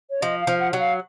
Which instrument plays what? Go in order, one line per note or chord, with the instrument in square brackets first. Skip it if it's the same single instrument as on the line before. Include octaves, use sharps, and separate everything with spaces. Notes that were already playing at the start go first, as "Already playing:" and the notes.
[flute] C#5
[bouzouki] F3 [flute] D#5
[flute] F5
[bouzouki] F3
[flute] F#5
[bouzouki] F#3 [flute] F#5
[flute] F5